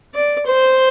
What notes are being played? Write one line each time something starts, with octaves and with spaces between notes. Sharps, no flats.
D5
C5